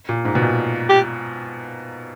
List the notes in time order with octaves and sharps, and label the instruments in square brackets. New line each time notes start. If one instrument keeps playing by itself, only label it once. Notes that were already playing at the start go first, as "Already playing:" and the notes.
[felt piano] A#2
G#2
B2
A#2
[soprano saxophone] G4